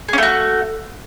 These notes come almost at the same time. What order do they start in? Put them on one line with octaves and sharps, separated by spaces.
G#4 C#4 A3 F#4